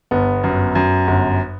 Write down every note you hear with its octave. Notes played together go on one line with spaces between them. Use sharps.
G1 B3
F#2
F#2
G1